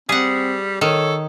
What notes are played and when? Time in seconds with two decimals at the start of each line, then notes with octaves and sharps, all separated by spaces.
0.09 G3 C4 G#4 F#5
0.81 D#3 A4 C#5